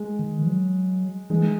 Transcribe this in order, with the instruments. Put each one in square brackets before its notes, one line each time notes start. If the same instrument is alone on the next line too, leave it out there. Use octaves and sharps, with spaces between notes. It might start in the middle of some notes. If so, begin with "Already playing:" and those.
Already playing: [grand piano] G#3
[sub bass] D#3
E3
F#3
[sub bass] E3 [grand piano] G#3